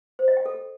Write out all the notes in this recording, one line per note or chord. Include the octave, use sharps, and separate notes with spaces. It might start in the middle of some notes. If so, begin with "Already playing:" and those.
C5
D#5
G5
A4